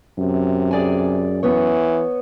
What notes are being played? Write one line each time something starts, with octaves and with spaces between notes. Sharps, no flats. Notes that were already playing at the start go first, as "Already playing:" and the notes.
F#2 C3
G#4 D5 G#5
E3 B3 C#5